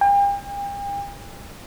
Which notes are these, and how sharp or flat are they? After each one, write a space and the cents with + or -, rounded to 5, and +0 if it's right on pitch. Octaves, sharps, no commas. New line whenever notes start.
G5 +40